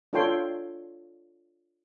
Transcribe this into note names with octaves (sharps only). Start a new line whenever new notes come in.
D4 F4 A4 C#5 G5 C6